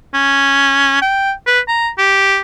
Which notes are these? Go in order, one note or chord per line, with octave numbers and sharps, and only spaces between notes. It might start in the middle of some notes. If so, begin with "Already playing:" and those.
C#4
G5
B4
A#5
G4